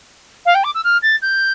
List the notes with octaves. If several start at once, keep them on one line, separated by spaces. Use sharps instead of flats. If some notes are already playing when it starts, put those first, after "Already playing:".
F5
G5
D6
E6
F6
A6
G6